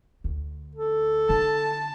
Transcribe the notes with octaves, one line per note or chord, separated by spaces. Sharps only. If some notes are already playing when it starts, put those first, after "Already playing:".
D2
A4
D3 D#4 A5